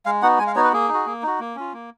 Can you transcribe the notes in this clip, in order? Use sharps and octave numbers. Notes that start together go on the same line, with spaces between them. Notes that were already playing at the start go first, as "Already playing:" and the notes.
G#3 F5
B3 D#4 F#4 F#5
G#3 G#5
F5
B3 D#4 F#4 C#5
B4
A#3 G#4
D#4
F#4
A#3
D#4 F#4
A#3
C#4 F4
A#3